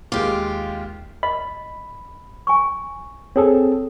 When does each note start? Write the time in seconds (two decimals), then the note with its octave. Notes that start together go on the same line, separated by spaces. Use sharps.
0.12 D#2 G#3 F4 G4 D6
1.23 D#5 B5
2.47 G#5 C#6
3.36 C4 G#4 A4 C#5